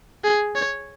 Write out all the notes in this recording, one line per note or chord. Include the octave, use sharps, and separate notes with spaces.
G#4
C#5